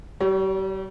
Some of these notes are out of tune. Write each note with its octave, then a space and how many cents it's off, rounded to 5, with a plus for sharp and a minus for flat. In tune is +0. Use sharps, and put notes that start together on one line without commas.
G3 -35 C#5 +25